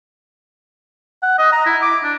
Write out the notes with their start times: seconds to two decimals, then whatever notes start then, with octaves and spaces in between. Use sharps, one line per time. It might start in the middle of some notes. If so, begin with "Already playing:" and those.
1.23 F#5
1.38 D#5
1.52 A#5
1.66 E4
1.82 D6
2.04 D4